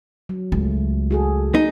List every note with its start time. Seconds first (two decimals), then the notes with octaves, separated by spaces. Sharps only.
0.29 F#3
0.52 C#2 A3
1.11 F#4 G#4 A4
1.55 A#3 D#4